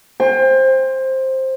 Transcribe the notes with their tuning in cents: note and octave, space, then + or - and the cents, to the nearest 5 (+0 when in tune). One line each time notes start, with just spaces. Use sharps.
C5 +10 G5 +35